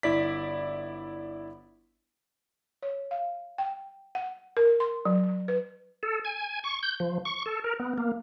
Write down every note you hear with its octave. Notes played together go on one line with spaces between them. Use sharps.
G1 E4 D5 B6
C#5
F5
G5
F#5
A#4
C6
F#3
B4
A4
G#5
C#6
G6
F3
C#6
A4
A#4
B3
A#3